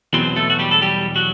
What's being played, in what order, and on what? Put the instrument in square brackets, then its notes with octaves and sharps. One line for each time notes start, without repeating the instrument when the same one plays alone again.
[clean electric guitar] E2 B2 F#3 C4 C5
A3 A4
F#4
G3 G4
A4
G3 G4
F#3 F#4